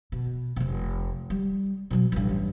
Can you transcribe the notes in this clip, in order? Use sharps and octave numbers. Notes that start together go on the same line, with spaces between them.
B2
F1 C3
G3
B2 F#3
A1 G2